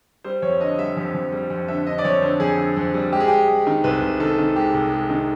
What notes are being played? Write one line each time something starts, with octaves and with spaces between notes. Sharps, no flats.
G3 C5
F2 C#5
D3 D#5
G3 E5
F2
F2
G3
F2
D3 E5
D3 D#5
D5
F2 C#5
D3 C5
F2 G#4
D3
F2
G3
G#3 G4
G#4
G#3 G4
G#3
D#3
C2 B4
C2
D#3 A4
D#3
G#3 G4
C2
G#3
D#3